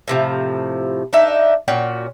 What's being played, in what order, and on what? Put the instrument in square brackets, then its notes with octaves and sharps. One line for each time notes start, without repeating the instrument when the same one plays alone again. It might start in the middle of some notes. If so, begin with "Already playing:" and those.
[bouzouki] A2 C3 F3
D4 D#4 E5
A#2 C#4 F#4 G5